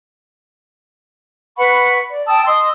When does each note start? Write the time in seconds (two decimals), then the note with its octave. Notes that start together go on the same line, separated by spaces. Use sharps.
1.57 B4 F#5 B5 C#6
2.09 D5
2.27 G5 A5 D#6 E6
2.46 D#5 C6 D#6 E6